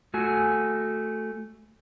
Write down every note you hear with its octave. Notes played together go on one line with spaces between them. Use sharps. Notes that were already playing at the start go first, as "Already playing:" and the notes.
A3 F#4 G#5